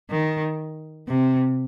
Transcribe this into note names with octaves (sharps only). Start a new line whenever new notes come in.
D#3
C3